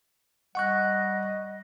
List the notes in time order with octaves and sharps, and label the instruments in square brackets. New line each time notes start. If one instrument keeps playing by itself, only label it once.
[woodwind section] G3 D#5 [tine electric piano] F#5 C#6 F#6